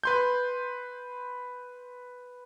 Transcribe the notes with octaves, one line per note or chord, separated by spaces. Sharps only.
B4 C6 G6